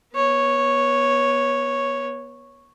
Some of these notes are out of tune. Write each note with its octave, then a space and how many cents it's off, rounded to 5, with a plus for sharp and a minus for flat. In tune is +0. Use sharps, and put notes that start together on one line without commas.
B3 -25 C#5 -5